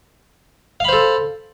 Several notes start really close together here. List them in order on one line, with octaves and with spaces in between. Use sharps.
F5 B5 C5 A4